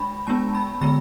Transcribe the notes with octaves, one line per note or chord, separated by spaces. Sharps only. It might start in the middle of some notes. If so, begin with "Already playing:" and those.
Already playing: G#3 D4 B5
G#3 B3 D4 A5
B5
D3 G#3 B3 B5